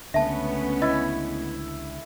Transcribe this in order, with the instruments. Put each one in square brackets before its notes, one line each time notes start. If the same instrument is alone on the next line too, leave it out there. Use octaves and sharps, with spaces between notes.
[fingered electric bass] C#2 D3 [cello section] A3 B3 C#4 [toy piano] E5 A5
[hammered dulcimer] E4 [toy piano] D#5